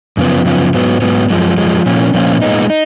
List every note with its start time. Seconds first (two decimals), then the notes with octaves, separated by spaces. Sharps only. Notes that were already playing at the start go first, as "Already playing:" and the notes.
0.17 F#2 C#3 F3 B3
0.45 F#2 C#3 F3 B3
0.74 G#2 F#3 B3
1.02 G#2 F#3 B3
1.30 F#2 F3 G#3
1.57 F#2 F3 G#3
1.86 A#2 F3 A#3 C#4
2.14 A#2 F3 A#3 C#4
2.42 A#2 G#3 B3 D#4
2.70 D#4